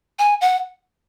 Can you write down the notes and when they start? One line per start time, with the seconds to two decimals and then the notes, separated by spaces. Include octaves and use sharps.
0.19 G#5
0.41 F#5